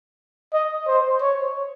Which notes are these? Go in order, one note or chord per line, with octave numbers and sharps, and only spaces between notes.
D#5
C5
C#5